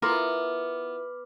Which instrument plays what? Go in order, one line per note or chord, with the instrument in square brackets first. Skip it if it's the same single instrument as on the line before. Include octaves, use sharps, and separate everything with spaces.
[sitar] B3 [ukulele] E4 F4 A#4 [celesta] D6 F6